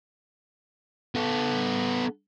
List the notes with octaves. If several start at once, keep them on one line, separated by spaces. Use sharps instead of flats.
B3 A4